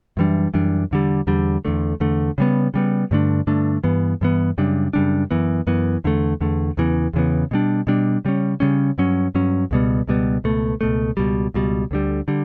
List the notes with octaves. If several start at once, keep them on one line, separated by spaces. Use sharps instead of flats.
F#2 E3 G3 D4
F#2 E3 G3 D4
E2 D3 G3
E2 D3 G3
E2 D3 A3
E2 D3 A3
C#3 G3 B3
C#3 G3 B3
G2 D3 A3 D4
G2 D3 A3 D4
G2 E3 B3
G2 E3 B3
F#2 C#3 G3 D4
F#2 C#3 G3 D4
F#2 E3 B3
F#2 E3 B3
E2 D3 A3
E2 D3 A3
E2 C#3 E3 B3
E2 C#3 E3 B3
B2 G3 D4
B2 G3 D4
C#3 G3 C#4
C#3 G3 C#4
G2 F#3 C#4
G2 F#3 C#4
C#2 B2 G3 B3
C#2 B2 G3 B3
C#2 B2 A3
C#2 B2 A3
C#2 B2 G3
C#2 B2 G3
D2 D3 G3
D3 G3